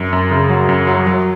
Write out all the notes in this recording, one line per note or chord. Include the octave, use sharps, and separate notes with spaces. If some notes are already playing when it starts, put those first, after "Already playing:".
Already playing: F#2
F#2
C#3
F#3
F#2
F#3
F#3